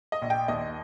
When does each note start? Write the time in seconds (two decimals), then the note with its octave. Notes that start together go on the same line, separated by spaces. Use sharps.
0.12 D#5
0.22 A#1
0.30 G5
0.48 D#2 D#5